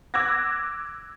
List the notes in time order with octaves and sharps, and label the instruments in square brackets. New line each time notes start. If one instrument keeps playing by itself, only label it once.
[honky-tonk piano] D6 E6 F#6 G#6 A#6